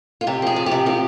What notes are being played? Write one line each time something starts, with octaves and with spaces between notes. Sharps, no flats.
F4
C3 G4
F3 G#4
C3
G4
C3
F3 G4